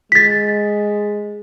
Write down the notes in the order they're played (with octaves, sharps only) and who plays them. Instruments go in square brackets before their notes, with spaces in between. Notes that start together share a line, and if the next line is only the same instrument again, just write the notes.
[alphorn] G#3 [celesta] A6 B6